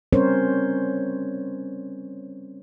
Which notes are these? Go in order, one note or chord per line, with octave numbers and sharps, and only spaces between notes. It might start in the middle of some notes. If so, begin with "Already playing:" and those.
G3 C4 C#4 A#4 C5 C#5